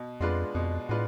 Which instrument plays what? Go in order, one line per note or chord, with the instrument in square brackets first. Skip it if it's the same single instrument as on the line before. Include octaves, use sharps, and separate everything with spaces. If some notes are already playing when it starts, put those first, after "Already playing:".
Already playing: [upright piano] B2
[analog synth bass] F2 [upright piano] G#3 D4 F4 B4
[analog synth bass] F2 [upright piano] B2
[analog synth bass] A2 [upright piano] G#3 D4 F4 B4